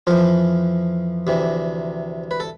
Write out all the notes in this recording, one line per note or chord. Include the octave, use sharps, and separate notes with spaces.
F2 E3 F3 F4
D2 C3 E3
B4
A4